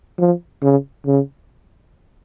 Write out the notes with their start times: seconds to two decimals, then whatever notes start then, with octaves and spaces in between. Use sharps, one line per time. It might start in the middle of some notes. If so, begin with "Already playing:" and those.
0.19 F3
0.63 C#3
1.06 C#3